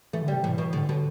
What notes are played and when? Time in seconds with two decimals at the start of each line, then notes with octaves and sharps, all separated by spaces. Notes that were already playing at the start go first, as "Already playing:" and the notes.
0.13 E3 A3
0.22 D3
0.28 G3
0.33 C3
0.43 A2 E3
0.58 B2 E3
0.73 A2 D3
0.89 B2